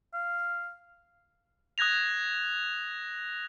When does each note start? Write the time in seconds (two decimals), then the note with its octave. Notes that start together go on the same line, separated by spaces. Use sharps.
0.14 F5
1.78 D#6 F#6 G#6 A#6 F7